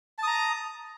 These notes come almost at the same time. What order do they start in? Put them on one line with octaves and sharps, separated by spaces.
A5 D#6 A#5